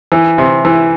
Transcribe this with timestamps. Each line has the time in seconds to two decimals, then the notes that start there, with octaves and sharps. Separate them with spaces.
0.12 E3
0.38 C3
0.65 E3